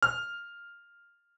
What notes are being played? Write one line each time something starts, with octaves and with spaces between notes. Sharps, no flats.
F6